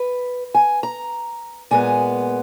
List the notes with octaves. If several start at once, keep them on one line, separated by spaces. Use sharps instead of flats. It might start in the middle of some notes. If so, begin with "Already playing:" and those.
Already playing: B4
G#5
A#5
A#2 G#3 B3 G#5